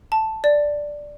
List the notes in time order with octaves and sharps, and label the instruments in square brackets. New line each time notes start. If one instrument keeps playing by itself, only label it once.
[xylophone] A5
D5